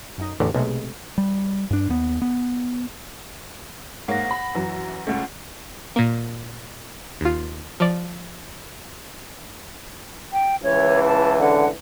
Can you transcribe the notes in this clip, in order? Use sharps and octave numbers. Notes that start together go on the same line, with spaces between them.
F#2 D#4
A1 E2 D3
B1 C3 G#3 A3
G3
G2 D4
D#2 B3
B3
G#2 A#3 C#5 F#5 A#6
B5
F#2 E3 F#3
C#2 A3 C#4 F#5
A#2 A#3
D#2 F4
F3 D5
G5
C#2 E3 C#5
A5
D3 F#5